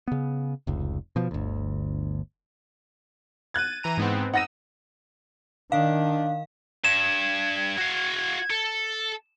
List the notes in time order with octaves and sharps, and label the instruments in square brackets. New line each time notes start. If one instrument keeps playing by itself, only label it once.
[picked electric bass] C#3 B3
F1 C#2
B2 F3
G1 D2
[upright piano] F#6 G#6 [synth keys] A6 D#7
[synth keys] E3 A#5 D#7
G#2 B3 C4
[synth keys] D#4 E6 [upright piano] F#5 A#6 D#7
[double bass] D#3 [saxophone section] D4 [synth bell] F5
[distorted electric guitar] G2 [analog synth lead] G#6 [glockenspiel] E7
[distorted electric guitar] F#4 F5
A4